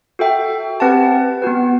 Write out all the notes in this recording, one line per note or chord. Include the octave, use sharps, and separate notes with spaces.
F#4 A4 E5 G5
C4 G4 B4 F#5 A5
B3 F#4 B4